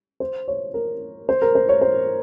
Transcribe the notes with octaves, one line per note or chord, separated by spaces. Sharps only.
C5
C#5
A#4
C5
A#4
C5
C#5
C5